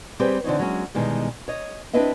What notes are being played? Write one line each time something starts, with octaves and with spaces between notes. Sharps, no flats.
G3 C4 G4 G#4 B4
D3 E3 C4 D#4 C#5
F#3 G#3 C#4
B2 D#3 E3 G3 G#3
C#5 D#5
C4 D4 E4 B4 D#5 E5